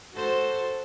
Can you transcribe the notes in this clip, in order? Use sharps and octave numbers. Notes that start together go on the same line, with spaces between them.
F#4 A4 C5